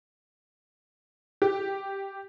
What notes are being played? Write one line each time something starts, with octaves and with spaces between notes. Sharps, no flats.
G4